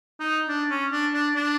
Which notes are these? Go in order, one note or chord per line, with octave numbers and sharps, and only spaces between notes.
D#4
D4
C#4
D4
D4
D4